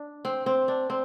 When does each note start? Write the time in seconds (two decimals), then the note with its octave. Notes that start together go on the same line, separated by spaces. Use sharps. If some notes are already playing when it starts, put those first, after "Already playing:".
Already playing: D4
0.25 C4
0.46 C4
0.68 D4
0.90 C4